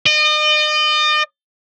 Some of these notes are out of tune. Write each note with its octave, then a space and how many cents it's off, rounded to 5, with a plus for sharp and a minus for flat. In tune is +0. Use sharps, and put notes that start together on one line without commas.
D#5 -40